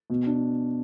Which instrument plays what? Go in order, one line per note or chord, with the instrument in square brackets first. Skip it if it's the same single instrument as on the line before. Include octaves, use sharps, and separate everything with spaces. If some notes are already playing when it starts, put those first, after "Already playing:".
[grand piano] B2
D4